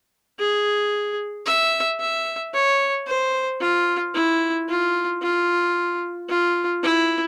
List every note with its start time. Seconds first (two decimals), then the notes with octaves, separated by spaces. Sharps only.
0.39 G#4
1.46 E5
2.00 E5
2.54 C#5
3.07 C5
3.60 F4
4.15 E4
4.69 F4
5.22 F4
6.29 F4
6.83 E4